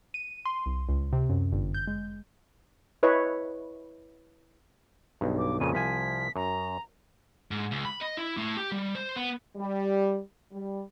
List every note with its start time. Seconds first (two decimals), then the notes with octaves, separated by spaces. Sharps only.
0.14 D#7
0.45 C6
0.66 C2
0.89 C#2
1.13 C3
1.30 F#2
1.52 G1
1.74 G6
1.87 G#3
3.03 E4 B4 C#5 D#5
5.21 B1 G2
5.38 D6
5.60 F2 A#2 C#3 D#7
5.73 C2 F3 G#5 B6
6.36 F#2 A#5
7.51 G#2
7.71 C#2
7.85 B5
8.01 D#5
8.17 E4
8.37 A2
8.57 G4
8.72 G3
8.95 C5
9.16 B3
9.56 G3
10.52 G3